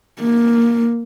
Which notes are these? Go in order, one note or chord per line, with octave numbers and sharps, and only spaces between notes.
A#3